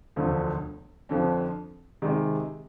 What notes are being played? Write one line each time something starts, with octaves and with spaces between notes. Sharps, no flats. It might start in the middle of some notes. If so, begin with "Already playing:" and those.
E1 D2 D3 F3 A3
F2 D3 F3
C3 D#3 G#3